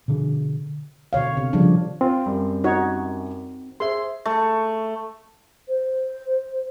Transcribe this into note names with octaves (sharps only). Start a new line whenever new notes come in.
B2 D3
B2 D3 C#5 F5
C3
C#3 F3 G3 D4
C4 F4
F#2 G3
D#4 F#4 C#5
G#4 C5 E5 C6
A3
C5